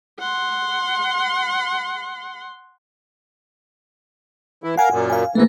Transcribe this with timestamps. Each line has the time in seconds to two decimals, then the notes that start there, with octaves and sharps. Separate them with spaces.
0.20 F#5 C6
4.64 E3 E4
4.77 A#4 F5 F#5 G#5
4.91 F#2 A#2
5.10 F5 G#5
5.35 G#2 E3 A3 A#3